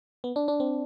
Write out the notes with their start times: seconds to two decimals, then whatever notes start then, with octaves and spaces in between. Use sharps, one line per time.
0.24 B3
0.36 D4
0.48 D4
0.60 C4